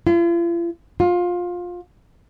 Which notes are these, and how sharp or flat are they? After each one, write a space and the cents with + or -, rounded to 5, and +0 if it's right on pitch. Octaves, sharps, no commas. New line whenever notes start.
F4 -45
F4 +20